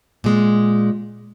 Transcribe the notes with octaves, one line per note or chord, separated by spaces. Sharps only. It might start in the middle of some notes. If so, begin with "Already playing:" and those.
A#2 G#3